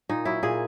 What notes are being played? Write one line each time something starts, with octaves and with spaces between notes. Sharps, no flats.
A#2 D#4
F#3 E4
A#2 G#4